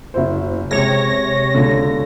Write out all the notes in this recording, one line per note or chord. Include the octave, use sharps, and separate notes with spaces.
F#1 E4 C5
C3 G#3 C#5 G#6 A#6
C#2 D3